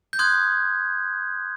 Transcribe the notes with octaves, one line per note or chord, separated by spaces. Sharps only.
G6
C6 D#6 F#6 G#6